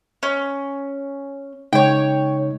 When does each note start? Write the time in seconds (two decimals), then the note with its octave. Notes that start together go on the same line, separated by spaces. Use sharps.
0.23 C#4
1.73 C#3 G#3 D#4 C#5 G5